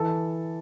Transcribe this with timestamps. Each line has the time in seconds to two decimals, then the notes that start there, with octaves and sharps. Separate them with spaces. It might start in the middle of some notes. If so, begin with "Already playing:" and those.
Already playing: E3 A4 A5